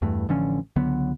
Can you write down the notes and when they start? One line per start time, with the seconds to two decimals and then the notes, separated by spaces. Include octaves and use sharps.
0.02 E2 G2 E3 A3
0.29 A1 D3 F3 C#4
0.76 C#2 D3 F#3 B3